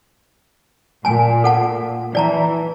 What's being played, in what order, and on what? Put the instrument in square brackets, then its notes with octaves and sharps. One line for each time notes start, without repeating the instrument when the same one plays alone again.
[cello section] A#2 [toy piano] G#5 A5
[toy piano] A4 F#5 A5
[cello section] E3 [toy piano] D5 A5 A#5